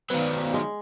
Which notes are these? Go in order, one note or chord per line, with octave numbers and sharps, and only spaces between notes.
D#3 F#3 B3 B4 C5 D5 F5
G#3